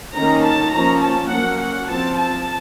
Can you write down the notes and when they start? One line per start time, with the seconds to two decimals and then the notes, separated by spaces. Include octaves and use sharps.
0.16 D#3 A#3 C#4 A#5
0.45 A5
0.74 F3 A#3 C#4 A#5
1.03 A5
1.31 F#3 A#3 C#4 F#5
1.61 F#5
1.89 F3 C4 A5
2.18 A5